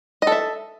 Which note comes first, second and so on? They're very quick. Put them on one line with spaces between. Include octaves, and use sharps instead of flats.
D#5 A4 E5